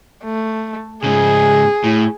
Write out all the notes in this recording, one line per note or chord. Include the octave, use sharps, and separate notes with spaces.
A3
G#2 C#3 G#4
A2